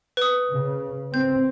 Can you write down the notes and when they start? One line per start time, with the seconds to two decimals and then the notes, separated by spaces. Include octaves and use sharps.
0.17 B4 D#6
0.51 C#3
1.14 C4 G6